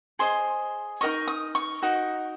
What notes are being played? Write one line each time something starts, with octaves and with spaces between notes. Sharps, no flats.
G#4 C5 D#5 C6
D#4 F#4 A#4 D#5 C#6
D#6
C#6
D#4 F#4 A#4 D#5